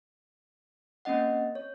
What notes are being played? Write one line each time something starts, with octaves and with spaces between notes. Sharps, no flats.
A#3 C4 C#4 D#5 F#5
C#5